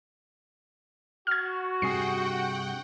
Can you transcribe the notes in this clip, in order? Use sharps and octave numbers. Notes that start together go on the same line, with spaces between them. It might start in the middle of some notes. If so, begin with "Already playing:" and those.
F#4 F6 G#6
G2 C3 G#4 F#5 G5 C7